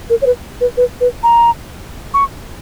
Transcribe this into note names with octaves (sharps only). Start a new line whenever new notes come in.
A#4
C#5
B4
B4
B4
B4
A#5
C#6